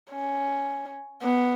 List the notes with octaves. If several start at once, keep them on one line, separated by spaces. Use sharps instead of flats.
C#4
B3